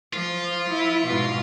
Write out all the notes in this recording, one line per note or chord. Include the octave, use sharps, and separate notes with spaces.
F3 F4
E4
G#2 B2